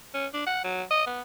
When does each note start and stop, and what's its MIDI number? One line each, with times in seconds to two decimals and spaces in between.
0.14 0.26 61
0.34 0.42 62
0.46 0.59 78
0.64 0.83 54
0.91 1.05 75
1.07 1.21 59